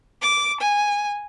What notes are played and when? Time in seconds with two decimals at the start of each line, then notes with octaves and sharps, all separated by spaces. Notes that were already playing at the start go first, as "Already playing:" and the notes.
0.22 D6
0.59 G#5